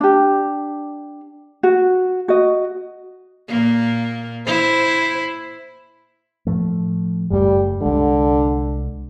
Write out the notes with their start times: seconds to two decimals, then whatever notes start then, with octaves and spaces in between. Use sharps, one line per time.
0.01 D4 G4
1.63 F#4
2.28 F#4 D#5
3.48 A#2 A#3
4.46 E4 C5
6.47 A2 F3 A3
7.31 F#1 F#2 G3 A3
7.81 C2 D3 G#3